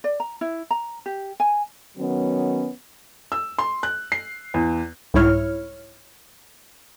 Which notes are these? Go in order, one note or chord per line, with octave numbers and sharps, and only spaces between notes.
D5
A#5
E4
A#5
G4
G#5
D#3 F#3 B3 C#4
E6
C6
F#6
C7
E2
C2 G#2 E4 C#5 F6